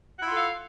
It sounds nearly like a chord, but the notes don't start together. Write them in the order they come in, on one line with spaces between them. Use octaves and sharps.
F#5 E4 F4 A4 F5